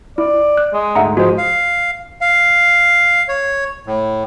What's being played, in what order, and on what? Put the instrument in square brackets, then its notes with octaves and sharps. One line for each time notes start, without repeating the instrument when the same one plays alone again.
[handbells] E4 [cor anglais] D5
[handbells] F#6
[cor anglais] G#3
[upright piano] D2 G#2 [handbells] E5 F#5 A#5
[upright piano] G#2 F3 [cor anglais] G#3 [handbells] F#4 C5
[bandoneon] F5
F5
C#5
A2